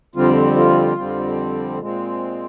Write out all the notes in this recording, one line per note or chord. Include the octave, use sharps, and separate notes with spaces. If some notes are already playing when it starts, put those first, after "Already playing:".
F2 D3 G3 C4 F4
F4
F2 D3 G3 C4
A#2 G#3 C4